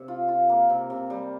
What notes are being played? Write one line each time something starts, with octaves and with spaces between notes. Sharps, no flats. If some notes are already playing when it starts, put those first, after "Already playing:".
Already playing: C3
F4
F4
A#3
C3
C3
G3